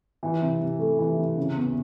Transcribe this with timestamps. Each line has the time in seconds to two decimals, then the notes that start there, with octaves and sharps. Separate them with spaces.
0.23 E3
0.41 C3
0.61 C3
0.79 A3
0.99 E3
1.18 C3
1.37 C#3
1.56 E2